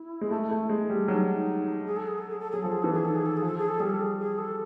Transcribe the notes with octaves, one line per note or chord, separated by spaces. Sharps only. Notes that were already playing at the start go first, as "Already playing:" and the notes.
Already playing: E4
G#3
A3
A3
G#3
G3
F#3 D#4
D#4
G#4
A4
G#4
A4
G#4
A4
F#3 G#4
F3 A4
G#4
E3 A4
G#4
D#3 A4
G#4
A4
G#4
F3
A4
G#4
A4
G3 G#4
A4
G#4
G#4
A4